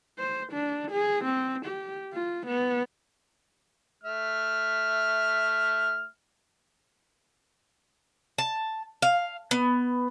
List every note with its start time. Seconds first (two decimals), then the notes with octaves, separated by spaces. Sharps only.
0.19 C5
0.53 D4
0.92 G#4
1.25 C4
1.66 G4
2.13 F4
2.47 B3
4.04 A3 E5 F6
8.38 A5
9.02 F5
9.51 B3